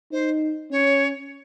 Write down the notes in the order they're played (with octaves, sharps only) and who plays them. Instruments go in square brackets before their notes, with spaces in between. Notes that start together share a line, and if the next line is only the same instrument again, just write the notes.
[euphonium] D#4 [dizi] C5
[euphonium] C#4 [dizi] C#5